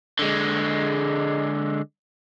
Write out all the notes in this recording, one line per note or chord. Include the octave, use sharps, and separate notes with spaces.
D3 G#3